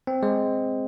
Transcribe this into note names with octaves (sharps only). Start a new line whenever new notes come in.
C4
G#3